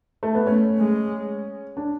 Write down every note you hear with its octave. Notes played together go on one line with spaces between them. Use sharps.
A3
B3
A3 C#4
G#3
D4